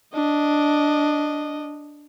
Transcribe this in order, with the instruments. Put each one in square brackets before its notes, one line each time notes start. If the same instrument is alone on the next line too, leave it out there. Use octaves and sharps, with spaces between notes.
[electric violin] D4 D#5